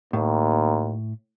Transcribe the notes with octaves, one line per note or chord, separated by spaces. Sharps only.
D#2 A2